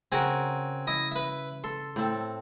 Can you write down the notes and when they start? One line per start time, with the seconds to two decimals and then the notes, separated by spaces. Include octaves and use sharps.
0.12 C#3 C4 F#4 A#4 G#5
0.87 E4 D#5
1.12 B4 E5
1.64 A4 C6
1.96 A2 C4 A4